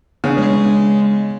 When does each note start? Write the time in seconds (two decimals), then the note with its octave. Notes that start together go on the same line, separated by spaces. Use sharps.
0.24 C#3 B3 D4 C#5
0.38 G#3